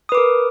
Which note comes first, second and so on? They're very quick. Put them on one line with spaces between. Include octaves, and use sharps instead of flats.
D#6 B4 D6 A#4